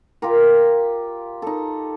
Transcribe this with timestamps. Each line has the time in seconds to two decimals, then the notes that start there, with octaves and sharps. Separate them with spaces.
0.22 F4 G4 A#4
1.42 D#4 A4